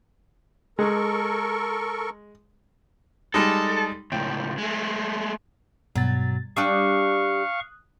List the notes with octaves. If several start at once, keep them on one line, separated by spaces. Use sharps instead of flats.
G#3 A4 A#4 C#6
G3 G#3 D#4 A4
C#2 A2 G5
G#3 A3
G2 B2 F#3 A6
G3 D4 G4 F5 C#6 D#6 F#6